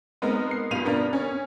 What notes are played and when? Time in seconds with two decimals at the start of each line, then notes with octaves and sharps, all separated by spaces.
0.22 G#3 B3 C4 D#4 A#4
0.51 C7
0.71 B1 G2 F4 D#7 F7
0.85 B3 D4 A#4
1.13 C#4